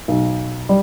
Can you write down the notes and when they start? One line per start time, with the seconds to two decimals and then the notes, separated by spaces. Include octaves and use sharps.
0.08 B1
0.69 G3